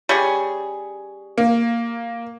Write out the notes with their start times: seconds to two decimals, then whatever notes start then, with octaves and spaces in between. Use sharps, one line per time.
0.09 G3 C#4 G#4
1.38 A#3